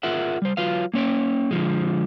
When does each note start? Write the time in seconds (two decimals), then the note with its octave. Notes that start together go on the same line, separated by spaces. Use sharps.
0.03 F4 G#4 A#4 E5 F#5
0.42 G3 C5
0.57 F#3 F4 B4 F5
0.94 A#3 C#4 C#5 E5 G5
1.51 D3 F3 G#3